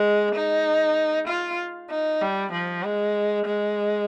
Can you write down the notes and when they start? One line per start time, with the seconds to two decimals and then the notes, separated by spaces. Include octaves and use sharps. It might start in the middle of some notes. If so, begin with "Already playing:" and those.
Already playing: G#3
0.35 D#4
1.28 F4
1.90 D#4
2.22 G3
2.52 F3
2.83 G#3
3.46 G#3